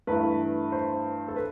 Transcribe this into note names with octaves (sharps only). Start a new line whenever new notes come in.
G2 E3 A3 E4 B4
C5
A4
B4